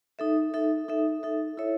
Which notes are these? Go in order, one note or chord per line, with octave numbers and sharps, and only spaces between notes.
D#4 A4 E5
D#4 A4 E5
D#4 A4 E5
D#4 A4 E5
E4 A4 C#5 E5